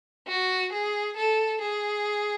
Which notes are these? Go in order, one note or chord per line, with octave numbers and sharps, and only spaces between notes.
F#4
G#4
A4
G#4